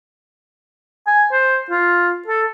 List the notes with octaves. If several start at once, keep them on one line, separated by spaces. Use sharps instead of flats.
G#5
C5
F4
A4